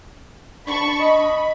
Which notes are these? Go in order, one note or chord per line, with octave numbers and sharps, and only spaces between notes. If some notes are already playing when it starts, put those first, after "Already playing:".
D4 A5 B5 C#6
D#5 B5